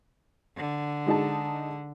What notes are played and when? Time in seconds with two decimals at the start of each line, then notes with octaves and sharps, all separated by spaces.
0.57 D3
1.06 G#3 D#4 A5